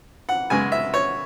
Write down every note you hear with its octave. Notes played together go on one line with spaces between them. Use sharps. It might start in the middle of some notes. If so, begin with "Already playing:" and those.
F#5
F#2 C#3 G#3 B3 G#5
E5
C#5